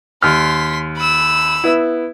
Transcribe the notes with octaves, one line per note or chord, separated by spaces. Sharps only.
D#2 C6 F6 B6
B5 E6
B3 E4